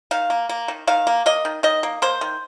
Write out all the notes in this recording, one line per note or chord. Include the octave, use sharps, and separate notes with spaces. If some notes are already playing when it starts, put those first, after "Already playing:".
D#3 F5
A#3
A#3
D#3
D#3 F5
A#3
A#3 D#5
D#3
D#3 D#5
A#3
A#3 C5
D#3